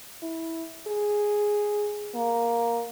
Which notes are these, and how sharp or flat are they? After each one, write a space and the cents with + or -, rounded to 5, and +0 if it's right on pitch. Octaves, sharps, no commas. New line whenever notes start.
E4 -15
G#4 +0
A#3 +5